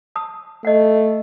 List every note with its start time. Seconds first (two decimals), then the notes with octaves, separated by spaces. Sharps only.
0.16 A5 D#6
0.65 A3 D#5 F#5